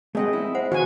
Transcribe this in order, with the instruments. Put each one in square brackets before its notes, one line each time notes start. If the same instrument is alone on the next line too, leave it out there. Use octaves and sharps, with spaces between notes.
[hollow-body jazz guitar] A3 C4 F#5 [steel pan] G#4 D#5
[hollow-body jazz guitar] E4
[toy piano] C5 F#5
[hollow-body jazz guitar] C#3 E3 [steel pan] F#4 G#5